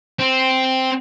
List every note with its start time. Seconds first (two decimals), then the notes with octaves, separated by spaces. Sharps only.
0.19 C4